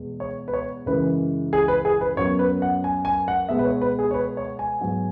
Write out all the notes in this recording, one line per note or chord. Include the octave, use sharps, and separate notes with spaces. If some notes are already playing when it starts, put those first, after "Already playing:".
Already playing: E2 B2 G#3 B3
C#5
B4
C#5
F#2 C#3 E3 G#3 B4
G#4
B4
G#4
B4
F#2 F#3 B3 C#5
B4
F#5
G#5
G#5
F#5
B2 G#3 B3 E5
B4
C#5
B4
G#4
C#5
B4
C#5
G#5
G#2 F#3 B3